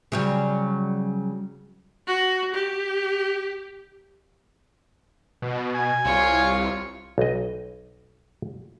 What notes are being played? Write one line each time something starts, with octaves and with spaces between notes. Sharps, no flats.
C#3 F#3 G3
F#4
G4
B2
G#5
C2 F4 C#5
B1 D#5